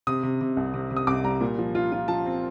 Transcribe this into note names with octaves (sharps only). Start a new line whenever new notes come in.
C3 D#6
C3
C3
C2
C3
C3
D#6
C2 D6
G3 A#5
A#2
F3
F4
F4
F3 A5
C4